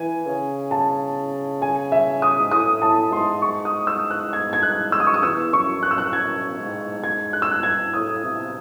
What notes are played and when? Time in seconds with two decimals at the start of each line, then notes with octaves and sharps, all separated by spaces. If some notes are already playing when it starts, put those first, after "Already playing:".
Already playing: E3 G#5
0.26 C#3
0.71 A5
1.62 G#5
1.92 E5
2.22 D#6
2.40 G#2
2.51 A2 D#6
2.82 A2 A5
3.12 G#2 C6
3.42 C#6
3.65 D#6
3.87 E6
4.10 F#6
4.33 G#6
4.53 G#6
4.63 F#6
4.92 E6
5.00 D#6
5.07 C#6
5.14 D#6
5.23 E2 E6
5.53 F#2 C#6
5.83 F#2 F#6
5.91 E6
5.98 F#6
6.13 F#2 G#6
6.59 G#2
7.04 G#6
7.33 F#6
7.42 E6
7.51 F#6
7.63 G#6
7.93 A2 D#6
8.24 C3